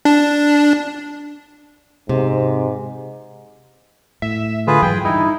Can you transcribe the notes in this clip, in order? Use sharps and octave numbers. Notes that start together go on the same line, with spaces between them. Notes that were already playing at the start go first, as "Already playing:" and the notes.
D4
G#2 C3
A2 E5
D3 F4 G#4 B4
G#2 E3 F#3 G#4 G5
G2 D#4 E4